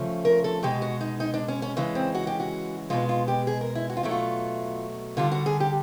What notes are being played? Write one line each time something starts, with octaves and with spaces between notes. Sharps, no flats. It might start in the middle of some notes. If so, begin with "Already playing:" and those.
Already playing: C#3 F3 A3
A#4
A4
B2 G#3 G4
F#4
D#4
D#4
D4
C#4
C#4
C#3 E3 G#3
C4
F#4
G4
F#4
B2 G#3 F4
F4
G4
G#4
A#4
E4
F#4
F4
B2 F#3 A3 E4
F4
D3 G3 F4
F#4
G#4
G4